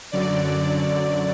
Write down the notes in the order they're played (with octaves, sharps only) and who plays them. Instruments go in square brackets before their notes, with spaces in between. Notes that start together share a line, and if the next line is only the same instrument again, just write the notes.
[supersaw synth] F#2 D3 F#3 D5